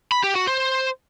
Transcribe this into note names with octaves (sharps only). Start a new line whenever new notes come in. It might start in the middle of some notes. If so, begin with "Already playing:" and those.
B5
G4
F#4
C5